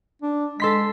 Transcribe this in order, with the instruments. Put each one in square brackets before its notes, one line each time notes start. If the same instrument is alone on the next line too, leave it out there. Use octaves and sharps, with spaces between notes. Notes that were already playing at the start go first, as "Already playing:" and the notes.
[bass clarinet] D4
[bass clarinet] G#3 [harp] A4 C6 B6